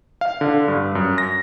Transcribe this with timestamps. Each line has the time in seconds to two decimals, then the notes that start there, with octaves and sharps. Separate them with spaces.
0.21 F5
0.41 D3
0.68 G2
0.95 F#2
1.18 A#6